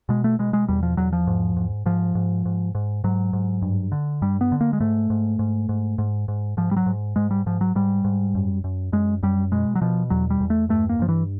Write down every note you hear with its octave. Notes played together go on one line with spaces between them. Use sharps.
B2 G#3
A3
B2 G#3
G#3
E2 G3
F3
E2 F#3
F3
G#2
G#2
G#2 F3
G#2
G#2
G#2
G#2 F#3
G#2
G2
D3
G2 G3
B3
D3
A#3
G#3
G#2 A3
G#2
G#2
G#2
G#2
G#2
G#2 F3
G3
F#3
G#2
G#2 G#3
G3
G#2 F3
F#3
G#2 G3
G#2
F#2
F#2
F#2 G#3
F#2 G3
B2 G#3
F#3
B2 F3
E2 F#3
G3
E2
A3
G2 A3
A#3
G2 F3
E3